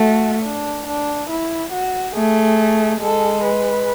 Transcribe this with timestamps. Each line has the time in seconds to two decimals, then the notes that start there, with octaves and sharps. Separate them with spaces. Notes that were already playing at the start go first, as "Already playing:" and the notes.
Already playing: A3 F#4
0.43 D4
0.87 D4
1.30 E4
1.73 F#4
2.15 A3 G#4
3.01 G#3 A4
3.45 B4